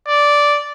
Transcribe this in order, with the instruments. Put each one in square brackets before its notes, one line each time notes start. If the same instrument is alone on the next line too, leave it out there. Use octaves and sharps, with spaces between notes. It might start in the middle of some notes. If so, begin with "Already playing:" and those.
[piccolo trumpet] D5